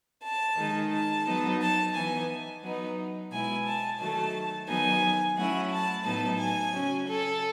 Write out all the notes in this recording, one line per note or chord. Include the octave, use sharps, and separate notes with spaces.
A5
D#3 G#3 D#4
A5
F#3 B3 D#4
A5
E3 B3 D#4 G#5
F#3 B3 D#4
B2 G#3 B3 E4 G#5
A5
D#3 F#3 A3 A5
D#3 F#3 B3 D#4 G#5
F#3 A3 C#4 E4 F#5
A5
A2 F#3 B3 D#4 A5
G#5
C#3 F#3 C#4
A4